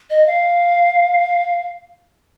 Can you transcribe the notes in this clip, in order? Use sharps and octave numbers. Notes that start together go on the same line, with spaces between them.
D#5
F5